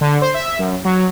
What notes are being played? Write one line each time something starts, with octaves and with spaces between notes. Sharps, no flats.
D3
C5
E5
F#2
F#3